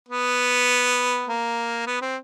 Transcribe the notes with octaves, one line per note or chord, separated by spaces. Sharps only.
B3
A#3
B3
C4